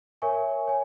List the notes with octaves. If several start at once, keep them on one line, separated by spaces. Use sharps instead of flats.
A#4 C#5 E5 G#5 C#6
C#5 G#5